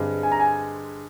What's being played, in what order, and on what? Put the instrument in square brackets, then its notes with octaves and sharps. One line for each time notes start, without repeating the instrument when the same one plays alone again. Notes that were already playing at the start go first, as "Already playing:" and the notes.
Already playing: [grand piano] G2 D3 G#3 C4
G#5
A#5
G#5